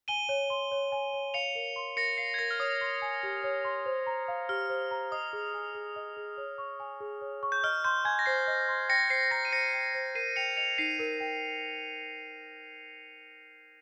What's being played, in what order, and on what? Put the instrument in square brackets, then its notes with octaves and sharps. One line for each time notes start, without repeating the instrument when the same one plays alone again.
[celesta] G#5 [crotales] D#7 G7
[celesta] C#5
C6
C#5
G#5
C#5
[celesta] F5 [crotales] C#7 F7
[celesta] A#4
C6
[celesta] A#4 [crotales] A#6 C#7
[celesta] F5 [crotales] C7
[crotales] G#6
[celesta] A#4 [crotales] A#6
[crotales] F6
[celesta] C#5 [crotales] D#6
[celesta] C6
G#5
G4
C#5
C6
C5
A#5
F5
[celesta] G4 [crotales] F6
[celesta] C5
A#5
[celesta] D#5 [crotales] D#6
[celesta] G#4
G#5
G#4
D#5
G#4
C#5
C#6
G#5
G#4
C#5
C#6
[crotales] G6
[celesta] D#5 [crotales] F6
[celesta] C6 [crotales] G6
[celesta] G#5 [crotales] G#6
[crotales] A#6
[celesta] C5 [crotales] C7
[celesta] D#5
C6
[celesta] G5 [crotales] A#6 C#7
[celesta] C5 [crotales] C7
[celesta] A#5 [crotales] A#6 C#7
[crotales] D#7
[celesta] C5 [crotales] A#6 C#7
[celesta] G5
C5
[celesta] A#4 [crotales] C7 D#7
[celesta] G5 [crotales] C#7 F7
[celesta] D#5 [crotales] C#7 F7
[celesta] D#4 [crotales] C7 D#7
[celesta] A#4
G5